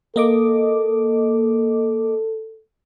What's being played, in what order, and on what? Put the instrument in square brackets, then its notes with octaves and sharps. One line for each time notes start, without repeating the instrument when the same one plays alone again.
[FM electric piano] A#3 D#5 D6 [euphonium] A4